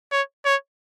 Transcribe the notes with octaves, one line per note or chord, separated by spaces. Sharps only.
C#5
C#5